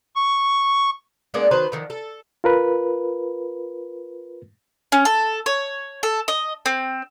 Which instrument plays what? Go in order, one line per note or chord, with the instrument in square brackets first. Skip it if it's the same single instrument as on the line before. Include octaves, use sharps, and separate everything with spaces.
[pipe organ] C#6
[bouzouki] G#3 A#3 B3 D4
D#3 F#3 B4 C5
D3 D#3 F3
A4
[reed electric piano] F4 A#4 B4
[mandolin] C#4
A4
C#5
A4
D#5
C4